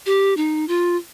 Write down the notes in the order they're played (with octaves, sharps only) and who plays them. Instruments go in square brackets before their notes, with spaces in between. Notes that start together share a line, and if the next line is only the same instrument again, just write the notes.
[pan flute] G4
D#4
F4